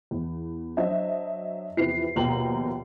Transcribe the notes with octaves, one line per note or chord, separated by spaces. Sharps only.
E2
F#3 D4 C5 D#5 E5
E2 C3 E3 F3 B4 C7
A#1 D#2 B2 G5 A#5 F#7